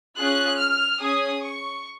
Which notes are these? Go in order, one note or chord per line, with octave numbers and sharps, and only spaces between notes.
C#4 F4 G#4 F#6
F6
C#4 G#4 D#6
C#6